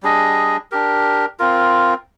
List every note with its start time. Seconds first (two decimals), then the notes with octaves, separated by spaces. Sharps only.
0.03 G3 D4 G#4 D#5
0.71 D4 G4 A#4
1.39 C4 F4 A#4